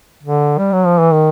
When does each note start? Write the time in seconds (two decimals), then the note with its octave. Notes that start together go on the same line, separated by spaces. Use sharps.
0.23 D3
0.58 G3
0.72 F#3
0.86 F3
0.99 E3
1.13 D#3